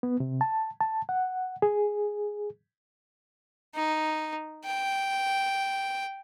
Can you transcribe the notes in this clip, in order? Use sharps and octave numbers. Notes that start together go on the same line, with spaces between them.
B3
C3
A5
A5
F#5
G#4
D#4
G5